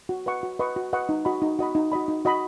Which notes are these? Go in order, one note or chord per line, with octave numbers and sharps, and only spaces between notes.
F#4
B4 D#5 F#5 C#6
F#4
B4 D#5 F#5 C#6
F#4
B4 D#5 F#5 C#6
D#4
F#4 D#5 B5
D#4
F#4 D#5 B5
D#4
F#4 D#5 B5
D#4
F#4 D#5 B5